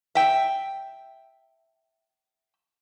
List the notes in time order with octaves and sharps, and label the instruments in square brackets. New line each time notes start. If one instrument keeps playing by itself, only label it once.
[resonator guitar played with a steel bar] E5 G5